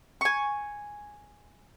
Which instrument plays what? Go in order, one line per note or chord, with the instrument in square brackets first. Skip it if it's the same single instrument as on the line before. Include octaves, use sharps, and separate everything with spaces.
[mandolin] G#5 C#6